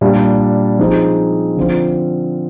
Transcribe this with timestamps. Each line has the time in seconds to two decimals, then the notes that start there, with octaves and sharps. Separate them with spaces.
0.01 A#2 G3 D4
0.79 F3 G#3 C4 D#4
1.57 D3 F3 C4 F4